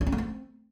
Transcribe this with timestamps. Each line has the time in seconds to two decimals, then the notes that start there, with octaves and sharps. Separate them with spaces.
0.01 D4
0.07 C#4
0.12 A3
0.18 C4